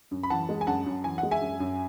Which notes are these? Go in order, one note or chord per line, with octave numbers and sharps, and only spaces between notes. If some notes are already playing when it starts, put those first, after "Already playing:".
F#2
B5
E3 F#5 A5
G#3
G#5
F#2 F#5 A5
F#2
E3 G#5
F#5
G#3
E5 G#5
F#2
F#2